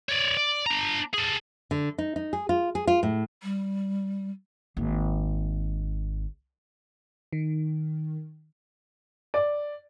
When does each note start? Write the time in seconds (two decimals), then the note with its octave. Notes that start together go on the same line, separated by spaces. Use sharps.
0.09 C#5 D5
0.37 D5
0.66 D4 A#5
1.14 G#4 A4
1.71 D3
1.98 D#4
2.16 D#4
2.33 G#4
2.49 F4
2.75 G#4
2.87 F4
3.03 A2
3.43 G3
4.77 G#1 A#3
7.33 D#3
9.34 D5